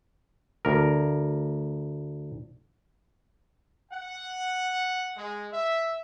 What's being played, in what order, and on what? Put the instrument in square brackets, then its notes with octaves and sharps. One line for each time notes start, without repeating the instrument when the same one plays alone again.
[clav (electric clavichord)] D2 A#4
[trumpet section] F#5
G#3
E5